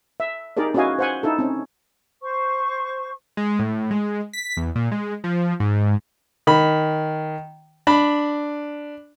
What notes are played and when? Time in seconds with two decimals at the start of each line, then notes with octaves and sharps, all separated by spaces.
0.20 E5
0.57 D#4 G4 G#4 A#4 D5
0.74 C#4 E4 F#4 D#5 F5 G#5
0.99 C5 F#5 G#5
1.23 D#4 E4 A4
1.39 C4 C#4
2.22 C5 C#6
3.37 G#3
3.59 A2
3.91 G#3
4.33 B6
4.57 E2
4.75 A#2
4.92 G#3
5.24 F3
5.60 G#2
6.47 D#3 B5
7.87 D4 B5